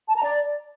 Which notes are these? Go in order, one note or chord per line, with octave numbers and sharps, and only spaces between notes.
A5
A#5
D5